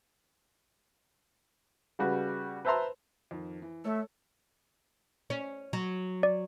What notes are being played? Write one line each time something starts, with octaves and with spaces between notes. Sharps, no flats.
C#3 G3 F#4 B4
B4 C5 E5 A5 A#5 C6
F2 D#3
E3
A3 A4 C#5
C#4
F#3
D5